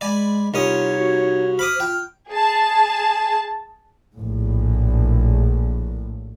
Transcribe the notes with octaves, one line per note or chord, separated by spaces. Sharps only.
G#3 D5 G#5 B5
C2 C#4 D#4 F4 C#5 D#6
F#4
C5 B5 D6 D#6 F6
F4 G5
G#4 A5
A#1 A2